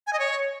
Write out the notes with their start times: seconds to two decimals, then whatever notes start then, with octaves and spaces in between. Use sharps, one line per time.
0.07 G#5
0.13 D#5
0.19 C#5